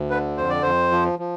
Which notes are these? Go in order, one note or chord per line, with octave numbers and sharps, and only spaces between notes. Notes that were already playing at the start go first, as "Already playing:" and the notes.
Already playing: D2
D3 B4
F2 C5
D5
F2 C5
F3
F3